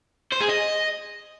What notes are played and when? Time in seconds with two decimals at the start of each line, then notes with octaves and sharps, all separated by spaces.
0.32 C5
0.40 G#4
0.49 D#5